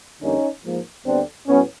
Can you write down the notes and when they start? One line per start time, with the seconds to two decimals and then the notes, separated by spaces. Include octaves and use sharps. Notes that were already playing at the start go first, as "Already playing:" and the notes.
0.21 F2 D3 G3 A#3 C#4 D#4
0.63 G#2 F3 A#3
1.05 D2 D3 G3 B3 C4 D4
1.47 A2 F#3 B3 C#4